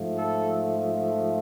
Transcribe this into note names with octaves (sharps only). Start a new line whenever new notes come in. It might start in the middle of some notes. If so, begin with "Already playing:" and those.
Already playing: G#2 F3 A3
A4